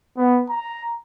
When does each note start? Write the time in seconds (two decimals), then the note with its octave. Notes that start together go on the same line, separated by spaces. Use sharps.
0.17 B3
0.50 A#5